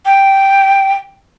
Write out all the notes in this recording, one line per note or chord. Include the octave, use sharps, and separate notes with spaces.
G5